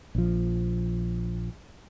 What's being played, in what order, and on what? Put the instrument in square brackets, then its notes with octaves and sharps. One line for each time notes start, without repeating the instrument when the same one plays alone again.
[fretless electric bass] A#1 F3